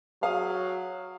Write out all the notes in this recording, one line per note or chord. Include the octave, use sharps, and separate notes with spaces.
F#3 G#4 F5 D#6